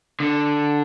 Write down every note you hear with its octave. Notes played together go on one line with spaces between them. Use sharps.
D3